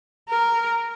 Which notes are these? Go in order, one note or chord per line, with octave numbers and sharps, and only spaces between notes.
A#4